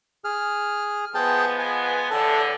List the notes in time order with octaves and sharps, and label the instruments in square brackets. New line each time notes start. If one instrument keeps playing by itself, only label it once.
[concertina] G#4 F6
[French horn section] F3 G#3 B3 [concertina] G#4 G5 A5
[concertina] G#5
[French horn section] E2 A2 D3 [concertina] A4